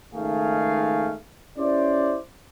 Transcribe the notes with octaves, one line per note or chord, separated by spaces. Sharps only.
C#2 G#2 D#3 A3 G#4 F5
C#4 E4 G4 C5 D5